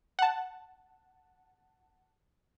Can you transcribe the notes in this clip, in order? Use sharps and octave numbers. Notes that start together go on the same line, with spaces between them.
F#5 A5